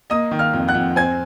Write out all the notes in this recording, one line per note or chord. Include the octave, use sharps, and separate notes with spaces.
A#3 D#5 D#6
D#3
F5 F6
F2
F#5 F#6
F2
C4 G#5 G#6